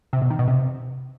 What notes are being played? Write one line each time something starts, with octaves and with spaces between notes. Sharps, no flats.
C3
B2
D#3
B2
C3